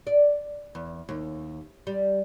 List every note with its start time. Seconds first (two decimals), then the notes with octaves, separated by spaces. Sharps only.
0.07 D5
0.75 E2
1.09 D#2
1.87 G3